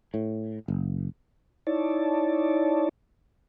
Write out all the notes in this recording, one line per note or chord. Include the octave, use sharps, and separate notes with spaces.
A2
F#1
D#4 E4 C#5 D5 A5